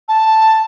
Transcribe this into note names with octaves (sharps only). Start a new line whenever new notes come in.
A5